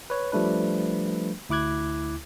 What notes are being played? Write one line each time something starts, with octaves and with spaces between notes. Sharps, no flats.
B4 C#5
F3 G3 A3 D4 B4
D2 E4 D6 F#6 G#6